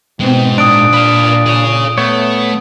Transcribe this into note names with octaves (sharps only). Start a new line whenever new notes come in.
G#2 B2 G#3 C4
A#2 D4 D#6 D7
B4 F5
G#4 C#5
A3 B3 C#5